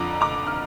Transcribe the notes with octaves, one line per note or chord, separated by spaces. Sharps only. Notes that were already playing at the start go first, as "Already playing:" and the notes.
Already playing: F2 D3 F3 A#5 D6
A#5 D6
F6